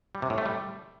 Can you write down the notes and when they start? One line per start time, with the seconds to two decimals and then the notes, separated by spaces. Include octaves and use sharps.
0.15 G3
0.22 C3
0.30 A2
0.38 A3
0.46 G3